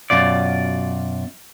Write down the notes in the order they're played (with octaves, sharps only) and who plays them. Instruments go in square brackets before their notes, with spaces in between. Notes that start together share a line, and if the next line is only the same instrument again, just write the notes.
[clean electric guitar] F#2 B2 F4 D5